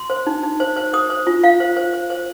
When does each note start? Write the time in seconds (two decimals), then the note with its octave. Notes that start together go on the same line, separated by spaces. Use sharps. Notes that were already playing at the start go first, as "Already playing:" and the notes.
Already playing: C6
0.10 C5
0.27 D#4
0.43 D#4
0.60 C5
0.77 C5
0.93 C5 D#6
1.10 C5
1.27 F4
1.44 F4 F5
1.60 C5
1.77 C5
1.94 C5
2.10 C5